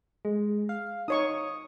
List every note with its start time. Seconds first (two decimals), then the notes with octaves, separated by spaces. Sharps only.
0.25 G#3
0.69 F5
1.08 D#4 C#5 C#6 D#6